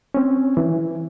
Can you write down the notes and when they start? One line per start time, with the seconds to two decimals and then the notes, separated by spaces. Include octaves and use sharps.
0.14 C4 C#4
0.57 E3